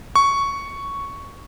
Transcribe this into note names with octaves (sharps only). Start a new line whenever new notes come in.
C#6